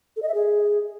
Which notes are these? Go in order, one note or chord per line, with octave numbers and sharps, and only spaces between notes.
A4
D#5
E5
G#4